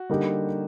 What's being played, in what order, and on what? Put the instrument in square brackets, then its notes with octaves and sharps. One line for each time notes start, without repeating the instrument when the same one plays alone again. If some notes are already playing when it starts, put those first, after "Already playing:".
Already playing: [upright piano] F#4
[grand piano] D3 G3 A#3 D#4 G4